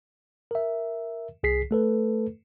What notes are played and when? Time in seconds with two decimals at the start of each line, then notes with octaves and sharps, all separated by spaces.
0.51 A#4 E5
1.43 C2 G#4 B6 C7
1.71 A3 A4 B4